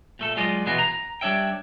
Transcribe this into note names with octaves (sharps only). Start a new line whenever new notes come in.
A#2 A3 A4
F#3 G#3 F4 D5 D#5
B2 E3 B3 F4 F#4 G#4
A#5
G3 D4 C#5 E5 G5